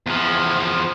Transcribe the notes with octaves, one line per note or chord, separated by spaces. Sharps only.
E2 F3